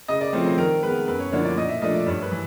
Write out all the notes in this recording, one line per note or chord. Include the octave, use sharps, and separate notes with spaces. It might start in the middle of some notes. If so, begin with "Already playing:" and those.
C#3 D#5
D5
F3 A3 C4 C#5
C5
D#3 A#4
G#3 B3 B4
F#2 B4
C#5
D3 F3 A#3 D4 C#5
D5
A#2 D#5
E5
F3 A3 D4 D#5
D5
G2 C#5
B4
E3